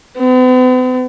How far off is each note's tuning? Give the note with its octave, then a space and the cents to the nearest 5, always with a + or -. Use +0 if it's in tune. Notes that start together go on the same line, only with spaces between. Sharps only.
B3 +45